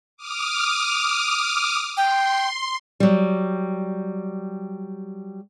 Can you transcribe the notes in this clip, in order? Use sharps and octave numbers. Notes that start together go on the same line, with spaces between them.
D6 D#6 F6
G5 C6
F#3 G3